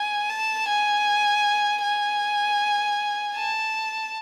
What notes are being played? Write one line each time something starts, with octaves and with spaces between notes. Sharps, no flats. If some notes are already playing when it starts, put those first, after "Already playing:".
Already playing: G#5
A5
G#5
G#5
A5